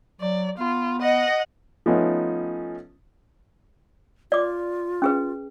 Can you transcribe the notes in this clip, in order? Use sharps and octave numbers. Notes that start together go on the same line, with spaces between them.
F#3 D5
B3 F4
D#5 F#5
F3 A3 B3 C#4 D#4
F4 D5 D6
C#4 G#4 B4